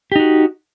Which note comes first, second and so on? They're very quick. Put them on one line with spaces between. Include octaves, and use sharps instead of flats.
G4 D#4 F#4